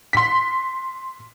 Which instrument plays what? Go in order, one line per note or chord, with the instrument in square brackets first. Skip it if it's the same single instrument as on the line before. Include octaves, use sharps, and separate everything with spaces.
[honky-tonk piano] C6 B6